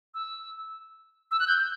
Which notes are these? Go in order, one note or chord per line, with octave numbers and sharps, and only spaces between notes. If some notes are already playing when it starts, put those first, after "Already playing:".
E6
E6
F#6
G6